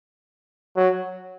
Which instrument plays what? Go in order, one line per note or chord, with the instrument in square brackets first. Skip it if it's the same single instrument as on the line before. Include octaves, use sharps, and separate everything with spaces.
[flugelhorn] F#3